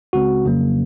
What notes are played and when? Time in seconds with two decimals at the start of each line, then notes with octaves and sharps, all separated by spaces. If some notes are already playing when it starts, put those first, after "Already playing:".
0.13 C#2 C#3 G#3 C4 F#4
0.45 F2 C#3 F#3 A#3